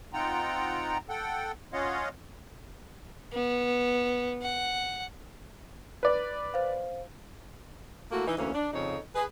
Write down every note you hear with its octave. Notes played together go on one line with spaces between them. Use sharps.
C4 D#4 F4 F#5 G5 A#5
A4 F#5 G5
C#4 F4 C#5 D#5 F5 F#5
B3
F#5
B4 D5
C5 F5
A3 A#3 E4 F#4
E3 D#4
D2 E3 A#3 C#4
D4
F2 C#3 D#4 A4 C#5
G#4 B4